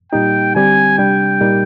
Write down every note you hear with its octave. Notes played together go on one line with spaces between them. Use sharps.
A#2 G3 A#3 D#4 G4 G5
D3 G3 C4 G4 G#5
C3 G3 D4 G5
A#2 G3 A#3 D#4 G4